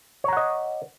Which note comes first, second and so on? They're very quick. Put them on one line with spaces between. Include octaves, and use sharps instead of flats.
C#5 A#5 F#5 D#5